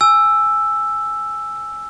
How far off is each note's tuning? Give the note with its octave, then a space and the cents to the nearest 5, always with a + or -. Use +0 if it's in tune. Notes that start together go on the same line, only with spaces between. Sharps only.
G#5 +0 E6 +5